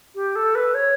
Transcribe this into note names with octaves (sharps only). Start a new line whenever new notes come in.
G4
A4
B4
C#5